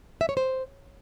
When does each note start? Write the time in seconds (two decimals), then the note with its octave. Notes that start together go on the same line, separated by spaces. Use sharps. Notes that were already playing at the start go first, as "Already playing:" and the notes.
0.21 E5
0.29 C#5
0.37 C5